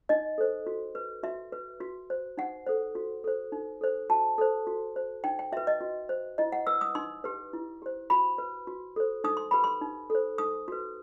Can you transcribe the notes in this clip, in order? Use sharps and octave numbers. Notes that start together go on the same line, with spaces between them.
D#4 D#5
A4 C5
F#4
B4
F#4 E5
B4
F#4
C5
D#4 F#5
A4 C5
F#4
A4 C5
D#4
A4 C5
F#4 A5
A4 C5
F#4
C5
D#4 G5
G5
F#4 B4 E5
D#5
F#4
C5
E4 D#5
F#5
B4 E6
D#6
D#4 C6
G4 B4
E4
G4 C5
F#4 B5
B4
F#4
A4 C5
D#4 D#6
C6
G4 B4 B5
C6
D#4
A4 C5
D#4 D#6
F#4 B4